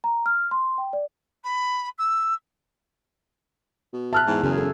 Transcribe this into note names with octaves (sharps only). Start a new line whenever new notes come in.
A#5
F6
C6
G5
D5
B5
E6
B2
E5 A5 F6 F#6
E2 G#2
F#2 C#3 C#4 G#4
E1 A4